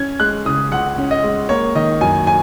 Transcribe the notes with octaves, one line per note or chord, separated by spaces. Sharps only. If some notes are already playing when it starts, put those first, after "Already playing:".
Already playing: C#4 G#6
G#3 F#6
C#3 D#6
C#2 F#5
C#4
D#5
G#3
A#3 C#5
D#3 D#5
F#2 G#5
G#5